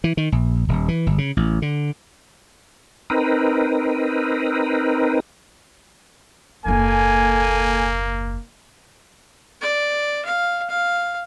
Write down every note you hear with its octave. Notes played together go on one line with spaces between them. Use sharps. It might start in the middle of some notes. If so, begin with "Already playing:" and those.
E3
D#3
A#1
D#1
E3
G1
C#3
A1
D3
C4 D#4 A#4 B4
F#1 D#2 A#3 A4 G#5
D5
F5
F5